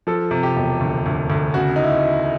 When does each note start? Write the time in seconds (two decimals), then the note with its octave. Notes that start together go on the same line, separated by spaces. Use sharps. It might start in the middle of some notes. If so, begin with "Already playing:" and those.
0.07 F3 A4
0.31 C3
0.43 G4
0.56 E1
0.80 D2
1.06 D2
1.30 D2
1.54 C#3 F#4
1.76 D#4
1.84 E4